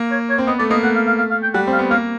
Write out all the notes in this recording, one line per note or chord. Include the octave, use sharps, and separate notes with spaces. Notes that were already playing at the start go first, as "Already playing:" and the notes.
Already playing: A#3
C#5
C#5
C4
B3 D#5
A3 D5
A#3 D#5
A3 F#5
F5
F5
F5
F5
G5
G3 F#5
C4
F5
B3
A#3 F5